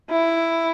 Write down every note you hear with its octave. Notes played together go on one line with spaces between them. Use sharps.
E4